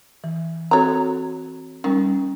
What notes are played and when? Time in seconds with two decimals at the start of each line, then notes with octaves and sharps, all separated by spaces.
0.24 E3
0.71 C4 F#4 A4 C#5 A#5
1.84 D#3 G3 C#4